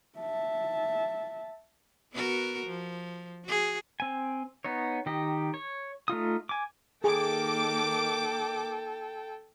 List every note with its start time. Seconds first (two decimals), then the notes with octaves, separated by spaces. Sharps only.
0.19 E5 A5
2.13 B3 F#4 A#4
2.67 F3
3.45 F#4 G#4
4.00 C4 G#5
4.65 B3 D#4 C#5
5.06 D#3 G4 D#5
5.54 C#5
6.08 A3 D#4 F4 D#6
6.49 G#5 D6
7.04 D#3 A#3 G#4 A4 G5 D6